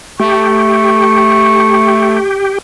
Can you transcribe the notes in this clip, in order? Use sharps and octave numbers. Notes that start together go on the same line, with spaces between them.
A3 G4 C#6